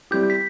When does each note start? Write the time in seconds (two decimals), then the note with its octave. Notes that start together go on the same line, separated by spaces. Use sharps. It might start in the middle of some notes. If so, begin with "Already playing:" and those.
0.11 G3 C4 E4 G4 G6
0.30 B6